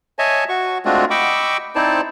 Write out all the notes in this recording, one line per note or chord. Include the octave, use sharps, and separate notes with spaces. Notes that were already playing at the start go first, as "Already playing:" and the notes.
C#5 D#5 E5 G#5 A5
F#4 C#6
G#3 A3 C4 D4 F4 F#4
D#5 G5 B5 C#6 D6 E6
C4 D#4 E4 C5 D5 A5